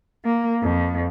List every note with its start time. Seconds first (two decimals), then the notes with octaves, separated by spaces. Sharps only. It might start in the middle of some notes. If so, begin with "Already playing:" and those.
0.23 A#3
0.60 F2